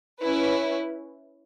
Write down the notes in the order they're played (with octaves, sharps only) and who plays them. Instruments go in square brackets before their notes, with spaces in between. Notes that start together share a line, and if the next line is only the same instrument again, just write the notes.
[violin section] C#4 E4 B4